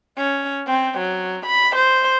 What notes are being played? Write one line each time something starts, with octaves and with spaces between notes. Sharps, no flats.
C#4
C4
F#3
B5
C5